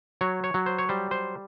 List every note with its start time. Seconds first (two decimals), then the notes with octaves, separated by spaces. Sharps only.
0.21 F#3 C#5
0.44 C#5
0.54 F#3
0.66 C5
0.79 C#5
0.89 G3 C5
1.11 C5